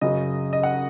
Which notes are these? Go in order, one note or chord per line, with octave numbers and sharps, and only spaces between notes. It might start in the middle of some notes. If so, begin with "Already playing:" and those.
F#2 C#3 F#3 D#5
D#5
F#5